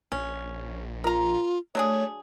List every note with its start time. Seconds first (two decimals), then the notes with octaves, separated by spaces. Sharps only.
0.12 A#1 C#4
1.04 F4 A#4 A#5
1.75 F#3 A3 D4 G#4 C#5